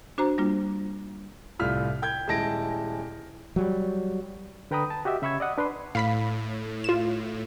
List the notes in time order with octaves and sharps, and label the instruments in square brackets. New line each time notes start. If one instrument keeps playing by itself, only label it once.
[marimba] D4 F#4 C5 A#5
G3 A#3 D4 F4
[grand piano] C2 A2 F4 F6 B6
G5 G6 G#6
D#1 G#3 E4 A5 A#6 D7
[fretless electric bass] F#3 G3
[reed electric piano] D3 B4 G5 A#5 B5 D#6
A5
F#4 G4 D#5 E5
C#3 E5 B5 C#6 E6 G#6
D5 D#5 F#5 D#6
D4 B4 B5 C6
[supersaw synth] A2 [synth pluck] F5 B5 B6
[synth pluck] F4 E7